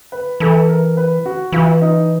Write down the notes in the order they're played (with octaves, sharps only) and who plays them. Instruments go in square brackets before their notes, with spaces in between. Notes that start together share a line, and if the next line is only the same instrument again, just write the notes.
[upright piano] B4
[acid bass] E3 [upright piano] A4
[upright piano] A#4
B4
F#4
[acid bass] E3 [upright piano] F4
[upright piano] D#4